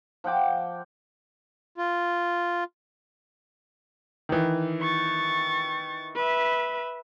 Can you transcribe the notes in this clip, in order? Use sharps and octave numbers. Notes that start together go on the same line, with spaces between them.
F3 F#5 G5 D6
F4
D#3 E3
C#6 A6
B4 E5